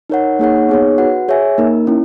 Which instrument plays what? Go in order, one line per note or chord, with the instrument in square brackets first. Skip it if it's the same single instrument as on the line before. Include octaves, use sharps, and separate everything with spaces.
[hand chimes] D#4 A#4 C#5 F#5
A#3 D#4 G#4 C#5 F#5
B3 D#4 G#4 C#5
F#4 B4 F#5
G#4 C#5 E5 G#5
A#3 D#4 A#4
C#4 E4